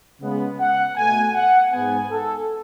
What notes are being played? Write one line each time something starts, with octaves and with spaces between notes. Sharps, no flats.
C#3 G#3 B3
F#5
B2 A3 G#5
F#5
G#2 G#3 B3 G#5
A4